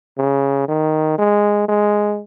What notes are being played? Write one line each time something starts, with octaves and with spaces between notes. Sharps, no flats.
C#3
D#3
G#3
G#3